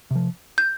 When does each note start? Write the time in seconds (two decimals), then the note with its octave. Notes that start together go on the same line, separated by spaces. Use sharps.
0.11 C3 F3
0.58 G6